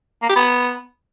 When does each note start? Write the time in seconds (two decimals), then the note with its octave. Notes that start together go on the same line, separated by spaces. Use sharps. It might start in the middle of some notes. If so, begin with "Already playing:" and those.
0.22 A#3
0.29 G4
0.36 B3